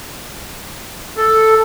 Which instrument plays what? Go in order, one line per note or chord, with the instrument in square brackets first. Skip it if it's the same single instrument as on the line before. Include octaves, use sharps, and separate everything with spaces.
[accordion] A4